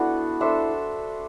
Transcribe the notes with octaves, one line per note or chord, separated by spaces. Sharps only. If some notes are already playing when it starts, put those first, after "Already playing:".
Already playing: B3 D4 E4 F#4 A4
D4 A4 C5 E5